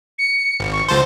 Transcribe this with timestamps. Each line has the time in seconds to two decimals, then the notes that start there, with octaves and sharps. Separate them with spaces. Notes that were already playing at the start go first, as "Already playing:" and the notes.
0.19 C#7
0.60 G#1
0.72 C#6
0.89 C#2 C5 A5